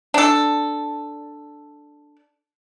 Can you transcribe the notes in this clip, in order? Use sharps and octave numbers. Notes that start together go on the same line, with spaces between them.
D4 A4